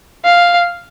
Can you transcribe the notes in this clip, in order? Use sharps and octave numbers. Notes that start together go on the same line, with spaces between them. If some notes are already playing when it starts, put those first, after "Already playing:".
F5